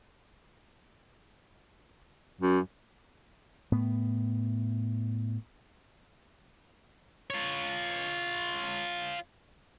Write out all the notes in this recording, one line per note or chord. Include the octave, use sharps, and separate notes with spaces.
F#2
A2 B3
F4 C#5